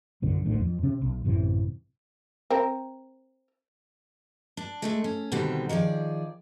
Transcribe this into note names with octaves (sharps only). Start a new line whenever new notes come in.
B1 F#2 D3
A1 D2 D3
F2
C3 C#4
B1
A1 F#2 C3 E3
C4 A#4
D4
G#3 A3 D4
C#4
B2 D3 D#3 G3 C4
D#3 F3 G#4 D5